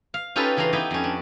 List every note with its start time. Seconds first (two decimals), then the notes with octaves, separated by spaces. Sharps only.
0.14 F5
0.36 C#4 D#4 F4 G4 A4 B4
0.57 C#3 E3 D4 D#4 A#5 C6
0.73 B3 D#4 E4 G4
0.91 F2 C#4
1.04 D4